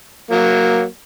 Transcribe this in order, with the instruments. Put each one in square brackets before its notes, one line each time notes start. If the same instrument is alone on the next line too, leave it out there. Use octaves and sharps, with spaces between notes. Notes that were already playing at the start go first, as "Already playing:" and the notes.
[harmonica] F#3 A#3